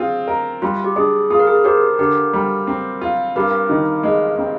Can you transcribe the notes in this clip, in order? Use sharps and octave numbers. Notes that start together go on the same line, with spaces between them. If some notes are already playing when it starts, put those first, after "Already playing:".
Already playing: C4 F4 G#4
A#4
G3 F4
G4
D4 G#4
F4 G#4
A#4
G#4
G4 A#4 C5
D3 G4 A#4
G3
C4
F4
G2 G4 A#4
D#3
G#3
C4